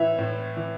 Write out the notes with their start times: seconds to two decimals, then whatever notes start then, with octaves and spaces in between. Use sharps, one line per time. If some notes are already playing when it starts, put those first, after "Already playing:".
Already playing: A2 E3 E4 E5
0.18 A2
0.56 E3